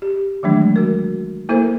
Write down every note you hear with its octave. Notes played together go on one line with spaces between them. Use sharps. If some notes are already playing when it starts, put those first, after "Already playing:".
G4
D#3 E3 F#3 G#3 A3 D4
F#4 A#4
A#3 E4 A4 A#4 C5